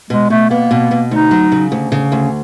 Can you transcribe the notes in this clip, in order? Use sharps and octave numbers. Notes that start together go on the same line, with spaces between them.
B2 G#3
B2 A3
A#3 B3
B2
B2
D2 D#4
F#3
C#3
D2
C#3
D2